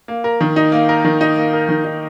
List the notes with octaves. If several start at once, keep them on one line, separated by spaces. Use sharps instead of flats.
A#3
A#4
D#3
D#4
A#3
A#4
D#3
D#4
A#3
A#4
D#3
D#4